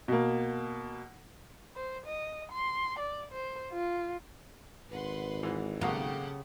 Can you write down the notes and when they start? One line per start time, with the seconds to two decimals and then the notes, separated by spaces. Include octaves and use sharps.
0.08 B2 A#3
1.76 C5
2.06 D#5
2.52 C6
2.99 D5
3.31 C5
3.73 F4
4.90 G#1 B4 F#5 C6
5.43 G#2 E3
5.81 B1 C#3 A#3 F#4 G4 A4 F#5